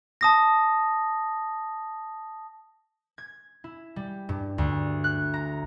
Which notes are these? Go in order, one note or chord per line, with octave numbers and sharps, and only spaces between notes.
A5 D#6 A#6
G#6
E4
G3
G2
D2
F#6
A#5